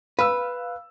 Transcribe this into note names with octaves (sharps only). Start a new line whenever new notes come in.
B4 F5 E6